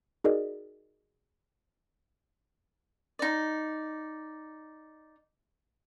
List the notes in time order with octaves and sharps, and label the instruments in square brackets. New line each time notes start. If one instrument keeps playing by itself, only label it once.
[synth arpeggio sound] D#4 F#4 G#4 A#4 D5 D#5
[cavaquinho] D#4 D5